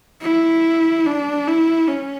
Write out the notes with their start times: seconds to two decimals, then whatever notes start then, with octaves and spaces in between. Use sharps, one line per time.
0.22 E4
1.06 D4
1.48 E4
1.88 C#4